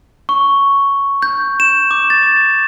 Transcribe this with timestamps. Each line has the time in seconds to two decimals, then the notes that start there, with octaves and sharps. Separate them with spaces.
0.29 C#6
1.22 G6
1.60 E7
1.91 D6
2.10 A6